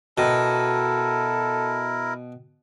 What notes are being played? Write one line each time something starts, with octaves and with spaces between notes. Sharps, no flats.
B2 E4 F#4 A4 A#4 G5 A#6